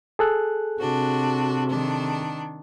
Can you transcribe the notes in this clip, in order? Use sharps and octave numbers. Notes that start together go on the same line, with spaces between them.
G#4 A4 F#6
C3 D4 F#4
D#3 D4